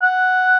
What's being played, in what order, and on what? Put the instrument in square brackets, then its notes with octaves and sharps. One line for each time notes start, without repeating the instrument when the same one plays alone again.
[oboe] F#5